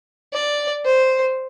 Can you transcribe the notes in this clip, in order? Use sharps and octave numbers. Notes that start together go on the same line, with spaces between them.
D5
C5